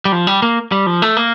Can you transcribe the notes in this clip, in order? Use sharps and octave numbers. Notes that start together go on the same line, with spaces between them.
G3
F3
G3
A#3
G3
F3
A3
A#3